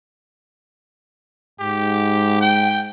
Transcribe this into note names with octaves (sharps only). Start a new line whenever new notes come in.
G#2 G4
G5